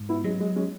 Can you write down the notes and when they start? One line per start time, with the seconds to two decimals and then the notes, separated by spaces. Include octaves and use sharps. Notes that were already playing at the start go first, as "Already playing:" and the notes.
Already playing: G#2
0.09 B3 E4
0.24 F#3 G#3 C#4
0.40 G#3
0.56 G#3 C#4